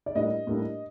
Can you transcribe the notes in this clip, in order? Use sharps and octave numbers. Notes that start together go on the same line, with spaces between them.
D5
A2 G3 A#3 D4 D#5
A2 G3 A#3 D4